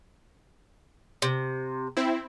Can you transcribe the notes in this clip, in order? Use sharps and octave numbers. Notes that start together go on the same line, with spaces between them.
C3
C4 E4